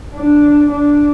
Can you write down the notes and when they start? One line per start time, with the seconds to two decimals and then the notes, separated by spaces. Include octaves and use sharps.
0.14 D4
0.70 D4